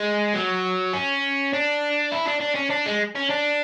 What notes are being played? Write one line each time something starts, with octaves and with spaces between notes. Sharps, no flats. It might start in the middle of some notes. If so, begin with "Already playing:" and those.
Already playing: G#3
F#3
C#4
D4
E4
D4
D4
C#4
D4
G#3
C#4
D4